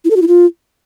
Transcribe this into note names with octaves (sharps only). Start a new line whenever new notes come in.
E4
A4
F#4
E4
F4